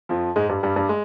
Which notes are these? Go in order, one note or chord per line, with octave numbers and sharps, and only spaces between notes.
F2 F3
G#2 G#3
G2 G3
G2 G3
G2 G3
G#3